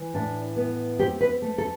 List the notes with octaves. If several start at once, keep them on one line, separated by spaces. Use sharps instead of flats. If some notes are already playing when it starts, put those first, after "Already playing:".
Already playing: E3
A2 D4
B3
C4 G4
B4
A3
A4